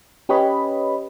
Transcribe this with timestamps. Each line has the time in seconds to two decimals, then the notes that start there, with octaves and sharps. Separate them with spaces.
0.29 C#4 G4 B4 C#5 D#5 B5